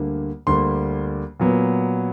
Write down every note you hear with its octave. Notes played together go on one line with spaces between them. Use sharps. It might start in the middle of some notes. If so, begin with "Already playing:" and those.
Already playing: D2 D3 G3 A#3
D2 D3 G3 A#3 C6
A#2 F#3 B3